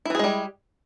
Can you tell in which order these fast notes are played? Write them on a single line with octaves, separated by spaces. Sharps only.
E4 E3 G#4 G#3 G3